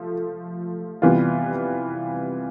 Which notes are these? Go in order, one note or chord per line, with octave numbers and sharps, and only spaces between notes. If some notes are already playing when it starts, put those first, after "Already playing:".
Already playing: F3 A3
C3 E3 G3 B3 F4